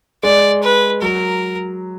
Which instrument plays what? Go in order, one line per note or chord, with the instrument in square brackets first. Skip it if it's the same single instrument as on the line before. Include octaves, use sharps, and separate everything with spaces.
[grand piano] G#3 [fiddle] D5
[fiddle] B4
[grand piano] F#3 [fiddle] A#4